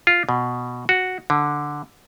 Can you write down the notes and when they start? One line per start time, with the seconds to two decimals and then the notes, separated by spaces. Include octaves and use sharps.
0.07 F4
0.29 B2
0.89 F#4
1.30 D3